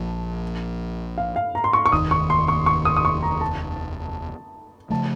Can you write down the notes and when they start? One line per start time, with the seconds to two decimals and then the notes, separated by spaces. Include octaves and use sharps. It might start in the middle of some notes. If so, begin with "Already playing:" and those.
Already playing: A#1 A#2 F3 A5
1.18 F5
1.36 F5
1.55 A#5
1.64 C6
1.73 C#6
1.86 C#6
1.92 F1 D#2 D#3 D#6
2.11 C#6
2.30 C6
2.48 C#6
2.66 C#6
2.85 D#6
2.97 D#6
3.05 C#6
3.22 A#5
3.41 A5
4.90 C#3 F3 A3 A5